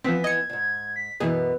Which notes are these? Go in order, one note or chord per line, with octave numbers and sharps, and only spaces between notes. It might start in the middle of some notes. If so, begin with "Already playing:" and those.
E3 F3 B3 C4 B6
D#5 G#6 C#7
D2 G#2
B6
F#2 B2 E3 B3 G#4 B4